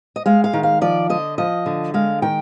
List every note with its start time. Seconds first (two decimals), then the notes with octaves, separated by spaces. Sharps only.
0.16 D#5
0.26 G#3 F5
0.44 F5
0.53 D#3
0.63 F5
0.81 F3 D5
1.10 D3 D#5
1.38 F3 D#5
1.66 D3
1.94 G#3 F5
2.22 D#3 G5